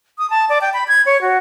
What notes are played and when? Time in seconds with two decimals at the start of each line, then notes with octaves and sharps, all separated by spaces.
0.18 D#6
0.30 A5
0.49 D5
0.61 G5
0.73 B5
0.88 G#6
1.06 C#5
1.22 F#4